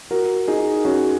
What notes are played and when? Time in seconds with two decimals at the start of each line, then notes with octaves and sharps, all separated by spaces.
0.11 F#4 A#4
0.48 D#4 G#4
0.84 C#4 F#4